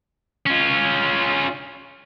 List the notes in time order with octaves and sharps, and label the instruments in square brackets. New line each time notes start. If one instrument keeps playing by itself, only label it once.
[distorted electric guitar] C#4 F4